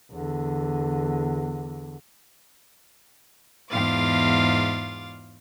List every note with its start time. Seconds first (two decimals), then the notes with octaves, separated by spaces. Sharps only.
0.12 E2 D3
3.70 E2 G#2 F4 F5 D6 A6